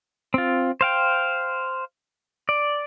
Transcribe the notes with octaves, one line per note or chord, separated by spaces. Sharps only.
C4 F4
C5 F5 G5
D5